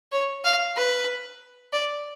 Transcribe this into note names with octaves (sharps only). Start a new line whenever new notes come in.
C#5
F5
B4
D5